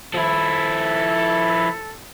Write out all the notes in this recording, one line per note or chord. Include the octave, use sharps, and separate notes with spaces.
F3 E4 A4